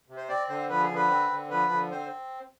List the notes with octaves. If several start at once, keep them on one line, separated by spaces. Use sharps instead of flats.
C3
C5
C4 D5
D3 C5
F3 B4
G#4
D3
B4
C4
D3
F3 B4
D3
C4 C5